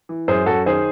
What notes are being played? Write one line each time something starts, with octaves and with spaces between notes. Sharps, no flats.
E3
F#2 G#4 C5
F#2 F#4 A4
D#3 G#4 C5